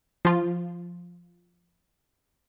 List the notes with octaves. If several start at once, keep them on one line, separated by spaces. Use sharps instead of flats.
F3 F4